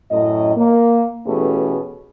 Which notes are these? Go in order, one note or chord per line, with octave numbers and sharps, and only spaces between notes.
F#2 A2 D#5
A#3
B2 E3 A3 C#4 G4 G#4